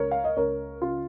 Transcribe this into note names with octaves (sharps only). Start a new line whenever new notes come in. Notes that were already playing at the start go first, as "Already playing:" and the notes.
Already playing: C#2 A#4 C#5
F5
D#5
C#2 A#4 C#5
C#3 F4